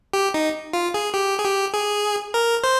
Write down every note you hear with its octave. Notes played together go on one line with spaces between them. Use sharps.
G4
D#4
F4
G#4
G4
G#4
G4
G#4
A#4
C5